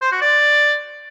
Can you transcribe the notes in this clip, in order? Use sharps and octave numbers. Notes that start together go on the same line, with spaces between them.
C5
F#4
D5